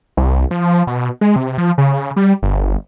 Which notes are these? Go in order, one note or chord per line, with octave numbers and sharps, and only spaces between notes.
C2
F3
B2
G#3
C3
F3
C#3
G3
G1